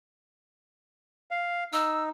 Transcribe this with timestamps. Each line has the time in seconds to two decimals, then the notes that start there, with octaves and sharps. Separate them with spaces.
1.31 F5
1.73 D#4 E6